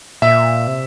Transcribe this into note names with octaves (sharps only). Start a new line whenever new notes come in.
A#2 E5
C3